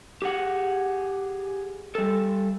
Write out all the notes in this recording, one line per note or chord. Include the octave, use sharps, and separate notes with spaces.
G4 G#4 F#5
G3 A4